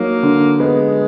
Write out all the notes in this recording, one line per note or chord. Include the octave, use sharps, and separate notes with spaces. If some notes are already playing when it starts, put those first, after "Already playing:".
Already playing: F#3 A#3 D#4
D3
G#3 B3